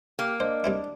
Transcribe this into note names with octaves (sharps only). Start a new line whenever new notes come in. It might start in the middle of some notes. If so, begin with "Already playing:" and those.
A#3 G4
D4 C5 D#5
G3 C4 E4